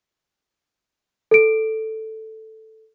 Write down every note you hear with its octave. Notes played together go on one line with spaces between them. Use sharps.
A4 D7